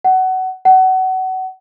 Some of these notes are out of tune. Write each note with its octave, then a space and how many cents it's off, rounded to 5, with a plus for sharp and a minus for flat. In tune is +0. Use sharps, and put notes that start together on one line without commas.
F#5 +20
F#5 +25